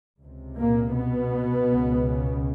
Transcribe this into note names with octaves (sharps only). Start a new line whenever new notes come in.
C#2 C3
A#2 A#3
B2 B3
C#2 C#3